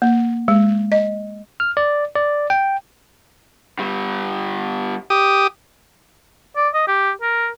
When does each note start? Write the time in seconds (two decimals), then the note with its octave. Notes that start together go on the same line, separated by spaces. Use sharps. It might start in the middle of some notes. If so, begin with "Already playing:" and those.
0.02 A#3
0.48 G#3
0.92 D#5
1.60 F6
1.77 D5
2.16 D5
2.50 G5
3.79 D3 G3
5.10 G4 D#6
6.56 D5
6.74 D#5
6.87 G4
7.21 A#4